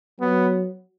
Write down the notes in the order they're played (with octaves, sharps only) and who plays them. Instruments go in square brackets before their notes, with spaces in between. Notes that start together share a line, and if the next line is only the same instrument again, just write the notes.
[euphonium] F#3 [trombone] B3